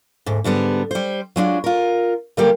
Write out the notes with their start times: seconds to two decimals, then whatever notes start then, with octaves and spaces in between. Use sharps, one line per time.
0.26 D2 G#2
0.44 G#2 D3 G3 B3
0.91 G3 C5
1.36 F#3 G#3 D4 F4
1.64 F4 A#4
2.37 D3 F3 G3 A#3 G4